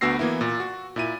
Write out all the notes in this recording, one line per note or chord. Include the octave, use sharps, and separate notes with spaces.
D2 B3 F#4 E6 A#6 C7
E3 A#3 B3 E4
A#2
F#4
A#2 E4 D#7